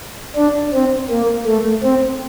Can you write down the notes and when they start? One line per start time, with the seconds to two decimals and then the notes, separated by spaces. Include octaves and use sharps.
0.36 D4
0.73 C4
1.10 A#3
1.47 A3
1.83 C4